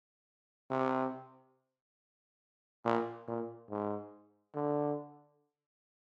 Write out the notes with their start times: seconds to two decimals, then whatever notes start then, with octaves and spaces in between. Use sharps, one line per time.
0.70 C3
2.85 A#2
3.28 A#2
3.70 G#2
4.55 D3